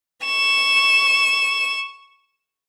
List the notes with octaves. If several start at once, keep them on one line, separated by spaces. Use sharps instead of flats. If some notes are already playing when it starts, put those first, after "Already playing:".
C#6 E7